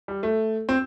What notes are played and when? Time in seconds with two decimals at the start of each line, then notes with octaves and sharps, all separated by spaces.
0.08 G3
0.23 A3
0.69 C4